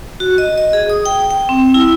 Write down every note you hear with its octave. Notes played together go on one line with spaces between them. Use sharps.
F#4
D#5
D#5
G#4
D#6
G5
G5
C4
E4